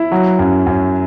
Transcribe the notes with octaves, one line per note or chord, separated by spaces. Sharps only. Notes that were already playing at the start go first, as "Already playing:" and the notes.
Already playing: E4
F#3
F#2
F#2